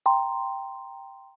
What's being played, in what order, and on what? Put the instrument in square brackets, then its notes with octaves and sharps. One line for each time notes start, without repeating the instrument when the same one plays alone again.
[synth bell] G5 A#5 C6